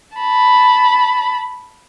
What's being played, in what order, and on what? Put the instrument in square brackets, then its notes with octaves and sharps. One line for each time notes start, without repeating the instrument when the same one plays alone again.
[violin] A5 B5